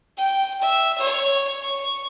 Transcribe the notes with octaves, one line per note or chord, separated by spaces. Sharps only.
G5
E5
C#5
C#6